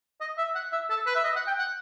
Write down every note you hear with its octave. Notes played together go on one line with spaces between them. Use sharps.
D#5
E5
F#5
E5
A4
B4
E5
D#5
F#5
G5
F#5